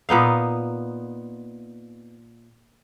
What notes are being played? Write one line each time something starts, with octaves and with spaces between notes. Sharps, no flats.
A#2 B3 D#4 F5